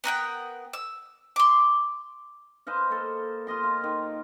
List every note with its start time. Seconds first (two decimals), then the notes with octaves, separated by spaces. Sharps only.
0.04 B3 A#4 F#5 G5
0.73 E6
1.36 C6 D6
2.67 B4 C5 D#5 F5
2.90 A#3 A4
3.47 F4 G4 D#5 C6
3.63 F5
3.84 D#3